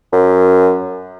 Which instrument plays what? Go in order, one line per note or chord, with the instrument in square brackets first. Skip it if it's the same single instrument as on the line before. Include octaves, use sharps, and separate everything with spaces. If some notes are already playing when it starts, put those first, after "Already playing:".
[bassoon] F#2